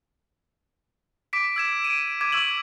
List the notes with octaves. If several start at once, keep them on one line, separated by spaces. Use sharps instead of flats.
D6 B6 D7
E6 G#6 E7
D7 D#7
D6 G#6
C#6 E6 G#6 F#7